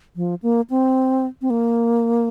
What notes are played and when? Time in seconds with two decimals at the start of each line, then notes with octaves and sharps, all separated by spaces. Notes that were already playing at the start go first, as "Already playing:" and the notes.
0.16 F3
0.43 A#3
0.70 C4
1.42 C4
1.50 A#3